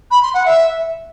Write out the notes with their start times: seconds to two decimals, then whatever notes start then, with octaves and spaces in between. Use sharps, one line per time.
0.11 B5
0.22 C6
0.34 F#5
0.45 E5